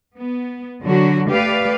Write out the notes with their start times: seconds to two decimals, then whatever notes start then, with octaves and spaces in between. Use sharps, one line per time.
0.17 B3
0.82 D3 F#3 F#4
1.28 A3 G4 B4 D5 F5